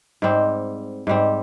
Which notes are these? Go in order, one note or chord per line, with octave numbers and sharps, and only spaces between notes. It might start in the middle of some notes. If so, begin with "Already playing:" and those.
G#2 G3 C4
G#2 G3 C4